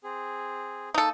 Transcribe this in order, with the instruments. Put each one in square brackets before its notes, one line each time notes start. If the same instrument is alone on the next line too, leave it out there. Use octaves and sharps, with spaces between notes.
[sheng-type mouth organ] C4 G#4
[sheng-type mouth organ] A#3 D#5 [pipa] D#4 A4